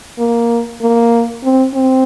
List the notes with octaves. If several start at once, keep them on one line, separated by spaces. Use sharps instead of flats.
A#3
A#3
C4
C4